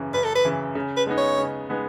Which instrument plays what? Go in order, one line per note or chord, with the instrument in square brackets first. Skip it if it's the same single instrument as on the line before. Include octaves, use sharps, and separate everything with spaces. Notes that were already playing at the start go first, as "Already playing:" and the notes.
Already playing: [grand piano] F#2 C#3 E3
[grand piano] F#2 [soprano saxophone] B4
[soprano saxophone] A4
B4
[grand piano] C#3 E3
C#3
[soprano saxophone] B4
[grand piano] G#3 B3 D#4
[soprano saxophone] C#5
[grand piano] C#3
G#3 B3 D#4